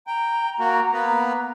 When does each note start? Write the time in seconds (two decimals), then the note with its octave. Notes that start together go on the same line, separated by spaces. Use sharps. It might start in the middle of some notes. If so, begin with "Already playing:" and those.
0.07 G5 A#5
0.60 A#3 F#4
0.93 A#3 B3 B4